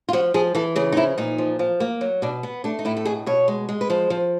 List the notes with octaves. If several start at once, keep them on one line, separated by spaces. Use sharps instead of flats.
F4
F3 F#4
F3 G#4
E3 A4
C#3 G#4
D#4
F3 E4
A#2 D#4
F3
F3
A#3
F#3
B2 D4
B3
A3 D4
D#4
A2 E4
A4
B2 G#4
B2 C#5
G#3
G#3
B4
F3 C5
F3